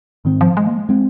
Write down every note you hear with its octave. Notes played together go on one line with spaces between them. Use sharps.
G#2 D#3 C4
F3
G#3
A#3
G#3
G#3 C4